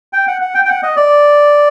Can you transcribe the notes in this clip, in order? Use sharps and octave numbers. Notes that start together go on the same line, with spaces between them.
G5
F#5
F#5
G5
G5
F#5
D#5
D5